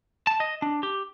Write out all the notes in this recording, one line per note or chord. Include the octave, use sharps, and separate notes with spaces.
A5
D#5
D4
G4